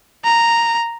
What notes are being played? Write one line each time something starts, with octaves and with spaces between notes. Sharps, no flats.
A#5